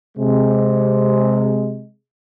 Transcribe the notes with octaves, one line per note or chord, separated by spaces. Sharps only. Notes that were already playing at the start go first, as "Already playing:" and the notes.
C3 G#3